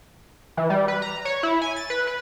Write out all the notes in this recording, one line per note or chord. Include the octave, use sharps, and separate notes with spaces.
E3
G3
B4
A#5
C#5
E4
G#5
A6
B4
B4